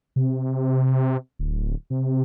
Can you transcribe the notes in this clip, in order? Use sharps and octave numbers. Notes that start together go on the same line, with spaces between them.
C3
D1
C3